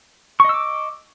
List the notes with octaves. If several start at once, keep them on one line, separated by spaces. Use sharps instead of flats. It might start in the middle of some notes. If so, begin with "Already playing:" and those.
D#5 C#6 D6 E6